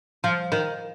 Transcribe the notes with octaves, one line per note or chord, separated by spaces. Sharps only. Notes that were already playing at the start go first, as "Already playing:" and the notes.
F3
D#3